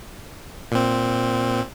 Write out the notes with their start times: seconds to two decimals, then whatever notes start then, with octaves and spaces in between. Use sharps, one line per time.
0.72 A#2 C4